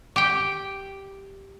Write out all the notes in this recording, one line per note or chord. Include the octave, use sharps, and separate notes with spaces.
G4 G5